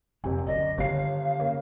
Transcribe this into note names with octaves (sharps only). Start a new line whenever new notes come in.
F#1 F2 C3 G#5
F#2 D3 A#3 D5 D#5
G1 D3 D#3 G3 F5 C7
C#3 A#3